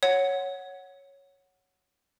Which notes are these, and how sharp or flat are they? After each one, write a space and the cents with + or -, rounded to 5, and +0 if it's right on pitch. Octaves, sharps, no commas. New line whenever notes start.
C#5 +0 F#5 +0